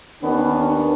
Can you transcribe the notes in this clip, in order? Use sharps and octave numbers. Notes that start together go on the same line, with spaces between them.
D#2 D#3 B3 C#4 D4